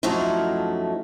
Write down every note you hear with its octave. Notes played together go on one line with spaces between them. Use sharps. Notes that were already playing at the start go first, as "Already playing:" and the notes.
F#2 F3 F#3 A3 D#4 E4